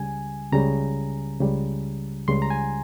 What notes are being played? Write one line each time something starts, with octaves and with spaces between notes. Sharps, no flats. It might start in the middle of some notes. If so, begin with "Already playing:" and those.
Already playing: C#2 C#3 G3 G#5
C#2 C#3 G3 A#5
C#2 C#3 G3
C#2 C#3 G3 C6
A#5
G#5